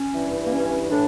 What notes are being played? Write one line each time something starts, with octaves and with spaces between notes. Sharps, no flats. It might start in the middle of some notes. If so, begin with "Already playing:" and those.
Already playing: C#4
G2 E3
A#3
C#4
A2 E3 D4